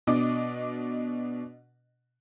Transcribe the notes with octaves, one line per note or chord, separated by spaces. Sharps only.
B2 D4 D#5 D6